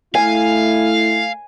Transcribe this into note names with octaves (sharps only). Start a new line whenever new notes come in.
A3 E4 F5 G#5